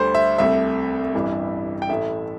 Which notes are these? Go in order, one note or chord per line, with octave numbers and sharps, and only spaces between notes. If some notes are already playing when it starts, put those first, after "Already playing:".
Already playing: D2 D3 G3 C5
E5
C2 C3 A3 E5
A1 G2 E3 G3
G5
A1 A2 A3 E5